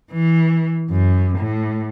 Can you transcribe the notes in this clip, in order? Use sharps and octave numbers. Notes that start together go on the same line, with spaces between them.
E3
F#2
A2